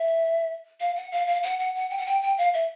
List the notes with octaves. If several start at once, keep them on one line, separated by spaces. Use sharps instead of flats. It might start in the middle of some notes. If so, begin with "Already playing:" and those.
Already playing: E5
F5
F#5
F5
F5
F#5
F#5
F#5
G5
F#5
G5
G5
F5
E5